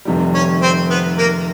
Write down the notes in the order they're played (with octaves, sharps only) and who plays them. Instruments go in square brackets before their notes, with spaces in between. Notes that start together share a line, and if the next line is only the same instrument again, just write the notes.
[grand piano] F1 F2 C3 D#3 G3
[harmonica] C#4 C#5
C4 C5
B3 B4
A#3 A#4